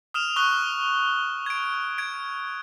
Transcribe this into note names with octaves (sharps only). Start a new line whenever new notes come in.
D#6 F6 E7 F7
C#6 D#6 F#6 G7
G#6 D7
G#6 D7